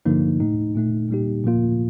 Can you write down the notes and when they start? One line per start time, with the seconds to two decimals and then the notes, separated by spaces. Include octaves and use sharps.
0.05 G2 D3 F3 A#3 D#4
0.40 A2 A3 D#4
0.75 A#2 A3 D#4
1.09 A#2 G3 A#3 D#4 G4
1.44 A#2 F3 A#3 F4